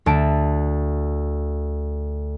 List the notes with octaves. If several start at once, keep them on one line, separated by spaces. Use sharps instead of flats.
D2 A5 D7